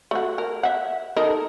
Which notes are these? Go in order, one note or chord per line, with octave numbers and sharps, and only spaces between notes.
A3 F#4
A#4
E5 F#5
D#4 A4 A#4